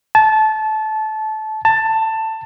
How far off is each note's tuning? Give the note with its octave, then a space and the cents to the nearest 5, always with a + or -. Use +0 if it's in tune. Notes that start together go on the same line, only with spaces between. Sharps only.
A5 -20
A5 +15